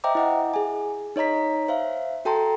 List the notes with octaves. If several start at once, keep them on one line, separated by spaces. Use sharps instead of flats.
C5 D#5 E5 G5 A#5 D6
E4 D#5 F#5
G#4 G#5
D#4 C#5 D#5 A#5 B6
C5 E5 F5
F#4 A4 G5 A5 A#5 C6